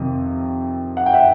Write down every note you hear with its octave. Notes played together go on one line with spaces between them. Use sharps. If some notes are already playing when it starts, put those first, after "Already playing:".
Already playing: F2 C3 D#3
F#5
G5
E5 F#5